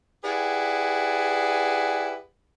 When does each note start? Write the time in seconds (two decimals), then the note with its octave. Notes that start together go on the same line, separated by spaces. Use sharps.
0.24 E4 G4 G#4 B4 D5 F#5